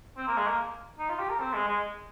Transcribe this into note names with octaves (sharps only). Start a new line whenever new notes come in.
C4
A#3
G#3
A#3
D#4
F4
G4
A#4
C4
G#3
G#3